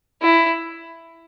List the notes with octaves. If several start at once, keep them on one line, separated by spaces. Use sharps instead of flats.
E4